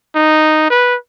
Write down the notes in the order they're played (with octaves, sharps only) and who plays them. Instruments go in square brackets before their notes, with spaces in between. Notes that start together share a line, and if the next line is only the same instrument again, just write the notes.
[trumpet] D#4
B4